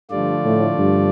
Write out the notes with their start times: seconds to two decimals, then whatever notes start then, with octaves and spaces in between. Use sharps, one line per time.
0.10 G2 D3 F3 A3 F4 D5
0.45 A2
0.78 G2